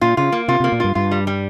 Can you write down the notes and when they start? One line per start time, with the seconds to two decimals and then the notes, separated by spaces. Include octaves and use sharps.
0.01 A#2 F4
0.17 C#3 F4
0.32 A#3
0.48 C3 F4
0.60 C3
0.64 A#3
0.72 A#2
0.80 G2 F4
0.95 G2 F4
1.11 G3
1.27 G3